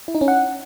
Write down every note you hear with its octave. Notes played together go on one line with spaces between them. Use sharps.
E4
D#4
C#4
F#5